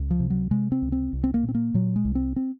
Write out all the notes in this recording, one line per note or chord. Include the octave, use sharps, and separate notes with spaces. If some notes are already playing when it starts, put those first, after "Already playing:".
Already playing: C#2
F3
C3
F#3
C3 G#3
C4
C#2
C4
C2
C4
A#3
A#2
C4
A#3
A#2 F#3
G#3
C2
C4
C4